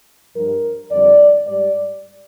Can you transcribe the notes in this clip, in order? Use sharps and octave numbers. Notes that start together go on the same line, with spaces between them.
G2 F3 A#4
F2 D3 G3 D5
G#2 G3 D5